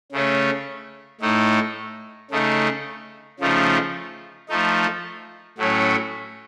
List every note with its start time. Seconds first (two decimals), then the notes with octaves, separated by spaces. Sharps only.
0.12 C#3 A3 C#4
1.21 A2 A3 D#4
2.31 C#3 A3 D#4
3.40 C#3 F3 A3 D#4
4.49 F3 A3 D#4
5.58 A2 F#3 A3 C#4